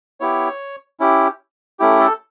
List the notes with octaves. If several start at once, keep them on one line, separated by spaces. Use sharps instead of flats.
B3 E4 G4 C#5
C#4 E4 G4
A3 C#4 E4 G4
A4